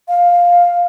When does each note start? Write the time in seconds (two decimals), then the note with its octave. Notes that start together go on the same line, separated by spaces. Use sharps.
0.08 F5